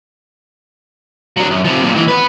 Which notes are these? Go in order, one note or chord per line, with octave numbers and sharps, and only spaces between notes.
F#3 D4
F#2
C3 F3
B1 A#2
G#2 E3
B3 B4